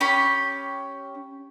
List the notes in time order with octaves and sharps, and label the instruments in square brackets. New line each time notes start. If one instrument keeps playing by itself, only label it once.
[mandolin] C#4 G4 B5